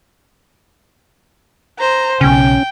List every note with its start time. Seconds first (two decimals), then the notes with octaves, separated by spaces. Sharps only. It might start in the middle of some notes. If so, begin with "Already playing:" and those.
1.79 C5 A#5
2.21 B1 C#3 C#4 G5